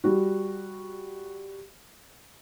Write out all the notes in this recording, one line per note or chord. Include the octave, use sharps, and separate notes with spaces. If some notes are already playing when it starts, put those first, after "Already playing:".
G3 F#4